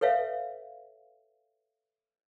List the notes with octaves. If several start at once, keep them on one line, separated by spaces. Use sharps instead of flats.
A4 B4 C#5 E5 F5